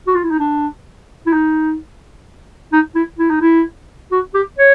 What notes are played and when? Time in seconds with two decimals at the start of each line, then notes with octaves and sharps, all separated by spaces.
0.07 F#4
0.15 F4
0.23 E4
0.31 D#4
0.39 D4
1.26 E4
1.33 D#4
2.72 D#4
2.95 E4
3.18 E4
3.30 D#4
3.41 E4
4.12 F#4
4.34 G4
4.59 C#5